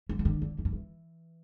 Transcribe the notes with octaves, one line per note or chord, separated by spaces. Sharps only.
F3
C#3
D3
D3
E3
F3
E3